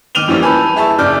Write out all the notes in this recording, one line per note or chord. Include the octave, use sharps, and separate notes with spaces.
D#3 D6 F6 D#7 F7 G7
F#2 E3 F3 G3 A#3 C#4
B4 G#5 A5 B5 E6 G6
E4 G#4 E5 A5 C#6
F#1 C#3 D5 D6 F6 G6